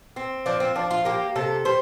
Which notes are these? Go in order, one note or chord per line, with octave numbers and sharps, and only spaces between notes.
C4
F3 D4
C4
F3 D4
F4
A#3 G4
C3 A4
G3 C5